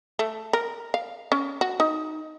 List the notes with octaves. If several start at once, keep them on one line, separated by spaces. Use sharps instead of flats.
A3
A#4
F5
C#4
F#4
D#4